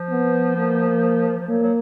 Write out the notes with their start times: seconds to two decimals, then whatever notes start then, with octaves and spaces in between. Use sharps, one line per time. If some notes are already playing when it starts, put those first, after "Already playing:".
Already playing: F3
0.11 B3
0.57 A#3
1.40 F3
1.49 F#3 A#3
1.63 F#3